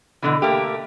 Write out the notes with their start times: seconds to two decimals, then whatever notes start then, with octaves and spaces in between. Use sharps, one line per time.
0.22 B2 D3 E3
0.42 A3 A#3 G4